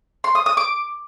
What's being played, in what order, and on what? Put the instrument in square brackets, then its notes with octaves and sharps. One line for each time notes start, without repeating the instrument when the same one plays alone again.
[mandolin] C6
D#6
D#6
D6